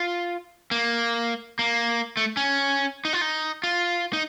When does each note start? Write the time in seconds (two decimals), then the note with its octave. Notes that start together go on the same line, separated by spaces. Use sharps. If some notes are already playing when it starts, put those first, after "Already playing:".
Already playing: F4
0.71 A#3
1.59 A#3
2.17 A3
2.37 C#4
3.05 D#4
3.13 F4
3.21 D#4
3.63 F4
4.13 D#4